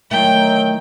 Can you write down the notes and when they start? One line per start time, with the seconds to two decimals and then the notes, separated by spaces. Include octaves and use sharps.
0.11 E2 D#3 F#3 A3 G5